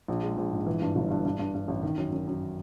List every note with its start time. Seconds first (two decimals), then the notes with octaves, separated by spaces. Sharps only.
0.08 A#1
0.23 G#3
0.37 A#1
0.52 G#2
0.67 E3
0.81 G2
0.96 G1
1.10 G2
1.25 G2
1.39 G2
1.54 G2
1.68 A1
1.83 D#3
1.97 F#2
2.12 F#2
2.27 F#2